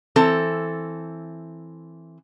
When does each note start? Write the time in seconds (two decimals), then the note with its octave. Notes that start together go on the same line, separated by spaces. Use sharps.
0.16 E3 C4 A4